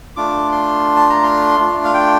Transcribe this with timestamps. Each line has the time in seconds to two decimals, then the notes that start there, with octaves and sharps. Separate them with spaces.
0.16 A3 D4 F4 D6
0.52 C6
0.96 A5
1.10 A#5
1.23 C6
1.59 A3 D4 F4
1.84 F5
1.94 G5